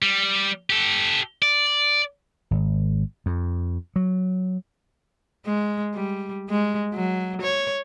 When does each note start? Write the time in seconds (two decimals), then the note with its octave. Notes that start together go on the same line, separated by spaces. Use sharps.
0.02 G3
0.70 G4 A4
1.42 D5
2.51 G#1
3.26 F2
3.96 F#3
5.46 G#3
5.94 G3
6.49 G#3
6.95 F#3
7.42 C#5